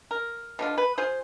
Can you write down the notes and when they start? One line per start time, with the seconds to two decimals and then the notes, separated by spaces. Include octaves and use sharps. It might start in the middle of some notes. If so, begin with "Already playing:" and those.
0.11 A#4
0.59 B2 D3 F4
0.78 B4
0.98 F4 G#4 C5